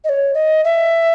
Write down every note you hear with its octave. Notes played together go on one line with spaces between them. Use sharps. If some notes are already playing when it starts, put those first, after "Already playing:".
D#5
C#5
D#5
E5